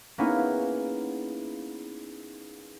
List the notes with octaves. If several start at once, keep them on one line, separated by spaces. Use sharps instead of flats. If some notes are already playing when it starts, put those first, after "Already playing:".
A#3 B3 C#4 D#4 E4 G#4